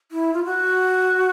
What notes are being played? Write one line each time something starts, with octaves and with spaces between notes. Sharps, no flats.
E4
F4
F#4